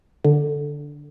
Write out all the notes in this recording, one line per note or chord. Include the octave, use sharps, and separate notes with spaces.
D3